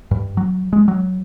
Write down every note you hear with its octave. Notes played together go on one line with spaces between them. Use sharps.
G2
F#3
G#3
F#3